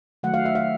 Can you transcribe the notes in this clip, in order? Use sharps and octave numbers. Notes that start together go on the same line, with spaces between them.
D#3 F#3 A3 F#5
F5
E5
F5